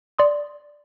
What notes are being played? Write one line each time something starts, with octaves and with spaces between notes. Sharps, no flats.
D5 C6 D#6